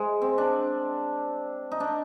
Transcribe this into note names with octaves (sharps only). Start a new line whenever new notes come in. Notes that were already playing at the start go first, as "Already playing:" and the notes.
Already playing: G#3 C5
C4
D4
D#4
D4